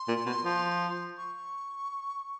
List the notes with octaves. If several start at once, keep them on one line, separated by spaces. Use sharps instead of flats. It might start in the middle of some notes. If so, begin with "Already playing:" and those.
Already playing: C6
A#2
B2
F3
C#6